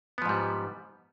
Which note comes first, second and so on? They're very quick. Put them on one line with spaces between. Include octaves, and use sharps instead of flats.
B3 F3 G#2 G3